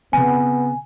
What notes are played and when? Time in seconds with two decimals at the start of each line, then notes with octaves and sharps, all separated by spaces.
0.13 C#3 B3 C4 G#5